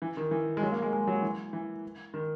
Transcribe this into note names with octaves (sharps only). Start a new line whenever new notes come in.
E3
D#3
E3
G#3
F#3
A#3
G#3
G#3
F#3
E3
E3
D#3